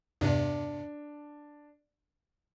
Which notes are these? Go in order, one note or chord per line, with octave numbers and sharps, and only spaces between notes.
E2 G2 C3 D4